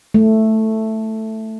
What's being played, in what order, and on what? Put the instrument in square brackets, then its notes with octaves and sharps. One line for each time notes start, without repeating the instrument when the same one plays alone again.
[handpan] A3